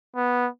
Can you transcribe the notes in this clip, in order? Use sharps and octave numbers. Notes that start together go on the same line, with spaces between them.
B3